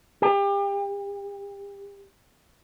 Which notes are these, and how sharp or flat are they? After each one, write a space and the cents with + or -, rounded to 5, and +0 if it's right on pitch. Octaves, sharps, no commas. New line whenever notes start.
G4 +35